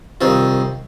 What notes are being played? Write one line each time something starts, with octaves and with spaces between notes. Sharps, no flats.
C2 D#3 C4 F4